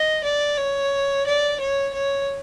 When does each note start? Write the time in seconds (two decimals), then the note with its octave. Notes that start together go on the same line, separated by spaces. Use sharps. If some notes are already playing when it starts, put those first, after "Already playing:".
Already playing: D#5
0.24 D5
0.58 C#5
1.26 D5
1.60 C#5
1.94 C#5